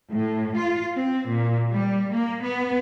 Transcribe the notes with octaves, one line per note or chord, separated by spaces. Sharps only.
A2
F4
C4
A#2
G3
A#3
B3